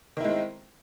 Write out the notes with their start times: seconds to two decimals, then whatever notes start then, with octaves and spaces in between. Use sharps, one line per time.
0.17 D#3
0.21 E4
0.24 G#3
0.28 C4